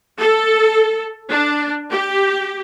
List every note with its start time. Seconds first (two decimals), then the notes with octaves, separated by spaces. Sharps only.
0.18 A4
1.30 D4
1.92 G4